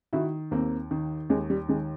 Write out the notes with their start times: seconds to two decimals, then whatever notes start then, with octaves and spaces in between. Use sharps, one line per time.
0.13 D#3 E4 F#4
0.51 D#2 A#3 C4
0.91 D#3
1.30 D#2 G#3
1.50 G3
1.69 D#3 G#3